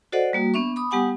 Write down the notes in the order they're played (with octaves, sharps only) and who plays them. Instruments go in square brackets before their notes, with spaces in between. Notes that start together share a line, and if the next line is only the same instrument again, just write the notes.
[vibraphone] F#4 A4 C5 D5 D#5 F#5
G3 A#3 F#4
B3 D4 E5 C#6
B5 D6 D#6
G3 B3 G4 F#5 G#5 D#6